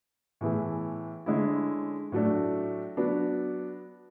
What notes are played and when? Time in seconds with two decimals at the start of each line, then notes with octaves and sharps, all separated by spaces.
0.41 A2 E3 B3 E4 G#4
1.26 D3 G#3 C#4 E4
2.12 A2 F#3 A3 D4
2.97 F#3 B3 D4